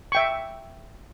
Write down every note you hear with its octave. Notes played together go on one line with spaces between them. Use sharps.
E5 G5 C#6